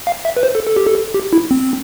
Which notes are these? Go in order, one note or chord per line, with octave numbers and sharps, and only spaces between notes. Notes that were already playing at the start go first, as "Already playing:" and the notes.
F5
E5
B4
C5
A4
A4
G4
A4
G4
E4
C4